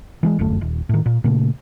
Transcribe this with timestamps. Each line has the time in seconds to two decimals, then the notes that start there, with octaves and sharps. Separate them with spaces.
0.23 E3 G3 G#3
0.39 D1 G1 F#2 A3
0.61 D#1
0.89 A2 D#3
1.06 A#2
1.24 A#2 C#3 A3